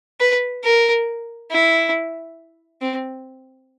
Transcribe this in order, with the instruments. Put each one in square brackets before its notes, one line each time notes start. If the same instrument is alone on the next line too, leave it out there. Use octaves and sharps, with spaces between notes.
[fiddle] B4
A#4
E4
C4